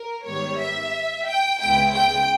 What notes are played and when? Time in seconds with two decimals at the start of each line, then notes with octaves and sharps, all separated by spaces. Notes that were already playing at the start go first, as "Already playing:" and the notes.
Already playing: A#4
0.25 G#2 D#3 G3 B3 C#5
0.59 E5
1.28 G5
1.61 C#2 C#3 G#3 B3 E4 G5
1.95 G5